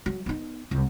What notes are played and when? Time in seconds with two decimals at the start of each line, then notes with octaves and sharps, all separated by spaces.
0.06 F#3
0.26 B3 D#4
0.71 C2